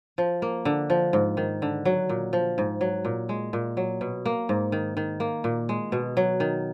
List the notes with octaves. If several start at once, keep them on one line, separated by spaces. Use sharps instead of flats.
F3
A#3
D3
F3
G#2
D#3
D3
F#3
A#2
F3
G#2
F#3
A#2
G#3
A#2
F#3
B2
A#3
G#2
D#3
D#3
A#3
A#2
G#3
B2
F#3
D#3